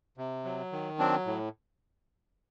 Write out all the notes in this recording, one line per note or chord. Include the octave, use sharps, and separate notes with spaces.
C3
F#3
D#3
F#3 C4 D4
A2